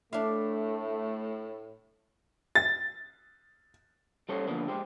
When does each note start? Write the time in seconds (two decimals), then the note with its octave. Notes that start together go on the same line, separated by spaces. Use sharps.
0.13 A2 A3 D4 E4 F5
2.55 A6
4.29 G3 C#4 A4 C5 C#5
4.47 D3 F3 A#3 B3 D4
4.68 G#3 G4 C5